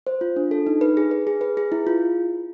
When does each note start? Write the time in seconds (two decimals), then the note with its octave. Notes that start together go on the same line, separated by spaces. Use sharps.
0.07 C5
0.21 F4
0.36 D4
0.51 A4
0.67 D#4
0.81 B4
0.97 G#4
1.11 B4
1.27 G#4
1.41 B4
1.57 G#4
1.72 E4
1.87 F4